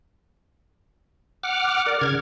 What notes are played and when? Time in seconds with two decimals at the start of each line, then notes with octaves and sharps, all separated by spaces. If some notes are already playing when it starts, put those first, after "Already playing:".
1.43 F#5 D6 F6
1.86 A#4 D5
2.01 C#3 F6 G#6